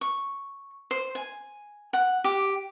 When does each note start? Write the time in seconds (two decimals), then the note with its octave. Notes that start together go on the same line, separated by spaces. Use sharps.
0.01 C#6
0.91 C5
1.15 G#5
1.93 F#5
2.24 G4